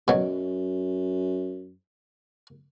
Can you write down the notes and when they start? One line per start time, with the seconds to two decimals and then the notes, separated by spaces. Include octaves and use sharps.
0.08 F#2 B2 F#3